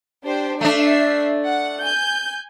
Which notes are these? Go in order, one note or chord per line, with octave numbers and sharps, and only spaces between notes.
D4 G4 C5
A3 D4 E5 C7
F#5
G#5 G6